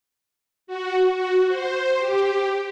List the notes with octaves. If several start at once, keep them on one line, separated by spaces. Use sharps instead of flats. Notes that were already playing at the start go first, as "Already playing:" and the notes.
F#4
F#4
C5
G4